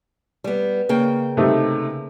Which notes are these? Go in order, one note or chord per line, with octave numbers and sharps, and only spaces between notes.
G3 B3
C#3 A#3 G5
C3 A3 D#4